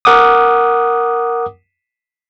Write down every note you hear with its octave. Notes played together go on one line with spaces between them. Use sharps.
A#4 F#5 D6 D#6